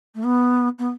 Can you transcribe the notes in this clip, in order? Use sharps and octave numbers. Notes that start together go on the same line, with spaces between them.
A3
B3
B3